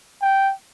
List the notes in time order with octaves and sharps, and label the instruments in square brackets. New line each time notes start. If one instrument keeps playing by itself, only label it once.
[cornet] G5